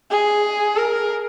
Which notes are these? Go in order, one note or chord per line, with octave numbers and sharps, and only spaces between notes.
G#4
A#4